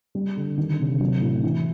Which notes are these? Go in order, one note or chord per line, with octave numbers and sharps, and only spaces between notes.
G3
D3
D#3
C3
F#3
A2
E3